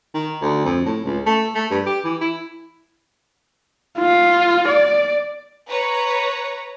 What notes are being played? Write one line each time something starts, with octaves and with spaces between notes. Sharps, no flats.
D#3
D2
F2
A2
C#2
A3
A3
G2
G4
E3
E4
F4
D5
B4 C#5 A#5